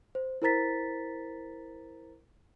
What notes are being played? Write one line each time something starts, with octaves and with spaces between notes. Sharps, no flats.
C5
E4 A#4 C5 A#5 A6 B6